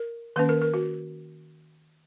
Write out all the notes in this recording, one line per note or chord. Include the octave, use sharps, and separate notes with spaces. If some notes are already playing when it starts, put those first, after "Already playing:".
Already playing: A#4
D#3 A#3 C#4 B4
A#4
A#4
F#4